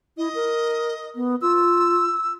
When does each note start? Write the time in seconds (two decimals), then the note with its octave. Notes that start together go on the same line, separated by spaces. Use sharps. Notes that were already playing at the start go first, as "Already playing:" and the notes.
0.18 E4 D#5
0.35 A#4
1.16 B3
1.42 F4 E6